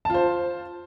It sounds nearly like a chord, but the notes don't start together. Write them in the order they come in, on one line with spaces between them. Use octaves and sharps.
A5 F4 C5